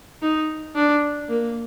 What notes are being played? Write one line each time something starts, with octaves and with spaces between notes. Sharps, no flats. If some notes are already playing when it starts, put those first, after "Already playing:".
D#4
D4
A#3